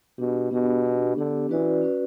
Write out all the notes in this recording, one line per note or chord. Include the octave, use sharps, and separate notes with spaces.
B2 B3 D4 G4
B2 B3 D4 G4
B3 D4 G4
D3 B3 D4 G4
E3 C#4 F#4 B4 D5
C#4 F#4 B4 D5